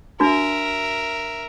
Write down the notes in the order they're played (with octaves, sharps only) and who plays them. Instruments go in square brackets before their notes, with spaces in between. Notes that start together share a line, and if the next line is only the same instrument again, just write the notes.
[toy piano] D4 F#4 [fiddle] A#4 E5